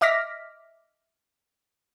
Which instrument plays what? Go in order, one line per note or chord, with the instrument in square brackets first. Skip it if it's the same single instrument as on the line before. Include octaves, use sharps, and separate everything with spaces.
[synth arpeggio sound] D#5 E5 D6 F6 A#6 B6